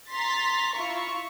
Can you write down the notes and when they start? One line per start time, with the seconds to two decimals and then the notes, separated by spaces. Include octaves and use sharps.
0.11 A#5 C6 A6 B6
0.74 E4 F4 C#6